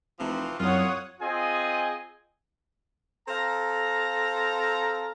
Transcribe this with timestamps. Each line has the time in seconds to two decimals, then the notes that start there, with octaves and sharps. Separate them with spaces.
0.20 F1 C3 E3 F3
0.60 C2 F#2 F4 C#5 F#5 D#6
1.21 C4 F4 G#4 D#5 G#5
3.28 C4 A4 F5 A#5